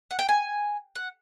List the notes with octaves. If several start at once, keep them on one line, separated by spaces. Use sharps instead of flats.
F#5
G5
G#5
F#5